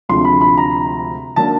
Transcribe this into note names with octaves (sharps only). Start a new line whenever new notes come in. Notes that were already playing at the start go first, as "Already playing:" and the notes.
D2 C3 F3 G#3 C6
B5
B5
A#5
D#3 F#3 A#3 D4 A5